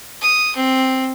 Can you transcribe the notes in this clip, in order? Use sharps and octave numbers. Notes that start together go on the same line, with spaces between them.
D#6
C4